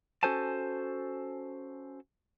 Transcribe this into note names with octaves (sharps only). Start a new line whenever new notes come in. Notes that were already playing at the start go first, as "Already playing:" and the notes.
C#4 F#4 A4 C5 G#5 A5